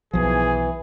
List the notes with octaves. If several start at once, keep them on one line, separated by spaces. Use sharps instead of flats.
B1 E3 F3 G#4